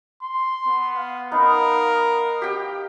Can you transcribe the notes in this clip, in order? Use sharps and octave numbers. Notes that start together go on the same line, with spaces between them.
C6
B3
F5
B3 D#4 A#4
G4 G5